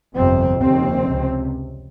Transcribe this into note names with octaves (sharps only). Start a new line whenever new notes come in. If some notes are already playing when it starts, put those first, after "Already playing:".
G1 F2 C3 C4
F1 D#2 C#3 C4
C#2 C3